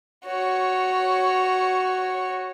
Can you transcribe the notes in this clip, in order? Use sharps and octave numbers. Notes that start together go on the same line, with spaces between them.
F#4 C#5